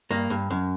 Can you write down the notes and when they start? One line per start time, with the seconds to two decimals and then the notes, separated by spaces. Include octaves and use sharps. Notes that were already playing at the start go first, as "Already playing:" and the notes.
0.10 G2 A#3
0.30 G2
0.51 F#2